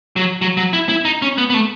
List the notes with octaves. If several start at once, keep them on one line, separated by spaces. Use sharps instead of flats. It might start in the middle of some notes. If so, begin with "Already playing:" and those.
F#3
F#3
F#3
E4
E4
D#4
C#4
B3
B3
A3